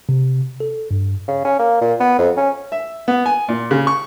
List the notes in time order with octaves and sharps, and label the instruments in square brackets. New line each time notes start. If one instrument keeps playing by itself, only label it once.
[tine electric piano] C3
A4
G2
[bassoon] C#3
C#4
A#3
A#2
B3
F2
C#4
[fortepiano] E5
B3
G#5
A#2
C#3
C#6